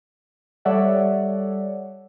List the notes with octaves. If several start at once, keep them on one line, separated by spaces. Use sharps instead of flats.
G3 A4 C#5 D5 E5 F#5